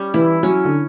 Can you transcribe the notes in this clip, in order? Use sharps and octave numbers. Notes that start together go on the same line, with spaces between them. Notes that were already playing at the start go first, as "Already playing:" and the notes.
Already playing: G3 C#4
E3 E4
F#3 C#4
D3